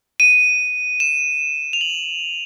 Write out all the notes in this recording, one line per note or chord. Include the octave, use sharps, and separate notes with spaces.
D#7
E7
F7
F#7